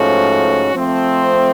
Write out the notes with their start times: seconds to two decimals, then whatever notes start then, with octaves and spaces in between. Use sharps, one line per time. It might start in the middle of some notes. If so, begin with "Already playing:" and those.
Already playing: G#2 F3 A3 C#4 F#4
0.72 F3 A3 C4